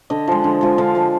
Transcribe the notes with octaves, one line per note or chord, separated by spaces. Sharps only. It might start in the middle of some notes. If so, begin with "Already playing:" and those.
D3 D#5
F3 G#3
D3
F3 G#3
D3 F5
F3 G#3